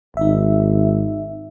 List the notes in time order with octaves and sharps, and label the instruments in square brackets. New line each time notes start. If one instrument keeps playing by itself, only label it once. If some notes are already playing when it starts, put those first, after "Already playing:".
[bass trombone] G#1 [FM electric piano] D#4 E5